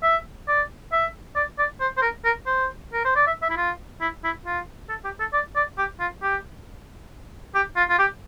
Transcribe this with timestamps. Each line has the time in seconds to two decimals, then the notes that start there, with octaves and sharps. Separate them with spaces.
0.03 E5
0.48 D5
0.92 E5
1.36 D5
1.58 D5
1.80 C5
1.97 C5
2.02 A#4
2.25 A#4
2.46 C5
2.93 A#4
3.05 C5
3.16 D5
3.27 E5
3.42 E5
3.50 E4
3.57 F4
4.01 E4
4.24 E4
4.45 F4
4.89 A4
5.04 G4
5.19 A4
5.33 D5
5.56 D5
5.78 G4
6.00 F4
6.22 G4
7.55 G4
7.76 F4
7.89 F4
7.99 G4